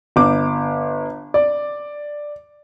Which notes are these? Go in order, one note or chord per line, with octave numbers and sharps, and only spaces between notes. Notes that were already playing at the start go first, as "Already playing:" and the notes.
G1 D6
D5